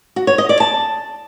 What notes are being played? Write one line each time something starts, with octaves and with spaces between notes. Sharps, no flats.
F#4
C#5
D#5
D5
A5